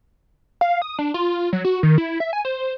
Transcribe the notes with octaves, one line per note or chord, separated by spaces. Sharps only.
F5
D#6
D4
F4
F#3
F#4
D#3
E4
E5
G#5
C5